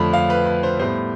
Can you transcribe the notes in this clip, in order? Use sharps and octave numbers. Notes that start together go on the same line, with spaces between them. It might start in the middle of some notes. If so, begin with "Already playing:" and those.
Already playing: F2 D3 F3 A3 B5
F5
B4
B4
C5
A2 G3 B3 C5